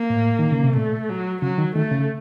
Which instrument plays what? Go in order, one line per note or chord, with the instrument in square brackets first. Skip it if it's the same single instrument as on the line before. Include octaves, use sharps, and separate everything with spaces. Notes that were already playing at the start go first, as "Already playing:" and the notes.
Already playing: [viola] A#3
[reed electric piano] A2
D#3
C#3
C3
[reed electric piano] A#2 [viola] A3
[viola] F#3
[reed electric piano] C#3 [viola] F#3
[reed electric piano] D#3
[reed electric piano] D#3 [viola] A3
[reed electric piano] C#3